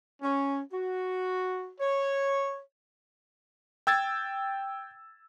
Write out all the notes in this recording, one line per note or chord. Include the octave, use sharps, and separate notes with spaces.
C#4
F#4
C#5
G5 E6 G#6 A6